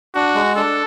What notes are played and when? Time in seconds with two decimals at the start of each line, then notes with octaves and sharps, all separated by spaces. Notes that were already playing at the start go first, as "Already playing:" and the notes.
0.15 D4 F#4
0.35 G#3
0.56 D4 A4